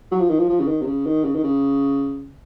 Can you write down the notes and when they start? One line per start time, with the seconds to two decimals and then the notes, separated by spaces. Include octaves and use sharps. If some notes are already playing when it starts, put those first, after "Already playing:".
0.12 F#3
0.20 F3
0.30 D#3
0.39 F3
0.49 F3
0.60 C#3
0.68 D#3
0.82 C3
0.87 C#3
1.06 D#3
1.24 C#3
1.35 D#3
1.44 C#3